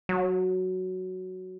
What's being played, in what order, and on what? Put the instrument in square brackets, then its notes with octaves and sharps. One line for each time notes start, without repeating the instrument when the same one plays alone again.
[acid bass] F#3